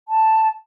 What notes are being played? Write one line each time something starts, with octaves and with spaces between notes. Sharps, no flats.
A5